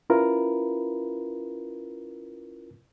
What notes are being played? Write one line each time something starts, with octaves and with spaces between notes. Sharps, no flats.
C#4 E4 F4 A#4 B4